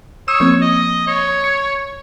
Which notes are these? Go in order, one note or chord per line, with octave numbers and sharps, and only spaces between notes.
C#5 D#6 E6 E7
F3 A#3 C4
D#5
C#5
C#7